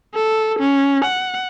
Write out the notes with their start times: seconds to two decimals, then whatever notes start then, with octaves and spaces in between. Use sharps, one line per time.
0.14 A4
0.60 C#4
1.05 F#5